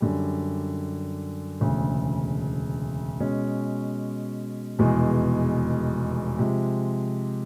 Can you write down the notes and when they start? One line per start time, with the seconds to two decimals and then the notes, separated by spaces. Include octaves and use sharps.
0.01 F#2 D3 G3
1.60 E1 D2 C#3
3.20 B2 G#3 C#4
4.79 F1 E2 B2 G#3
6.39 C3 F3 G#3